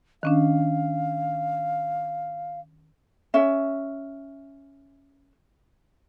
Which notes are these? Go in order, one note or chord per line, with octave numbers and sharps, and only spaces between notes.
D#3 C#4 D4 F5
C#4 E5